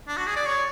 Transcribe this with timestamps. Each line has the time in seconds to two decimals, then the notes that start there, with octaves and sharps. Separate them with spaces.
0.07 D4
0.17 F#4
0.27 G#4
0.36 D5
0.46 C#5